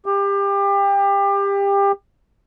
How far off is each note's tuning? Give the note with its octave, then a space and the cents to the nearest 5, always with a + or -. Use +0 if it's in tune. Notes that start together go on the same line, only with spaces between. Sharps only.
G4 +25